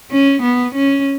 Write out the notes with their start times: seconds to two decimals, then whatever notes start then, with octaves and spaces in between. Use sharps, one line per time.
0.11 C#4
0.42 B3
0.75 C#4